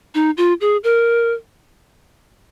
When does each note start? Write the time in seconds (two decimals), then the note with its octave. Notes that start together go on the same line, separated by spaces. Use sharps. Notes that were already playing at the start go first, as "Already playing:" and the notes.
0.14 D#4
0.37 F4
0.61 G#4
0.83 A#4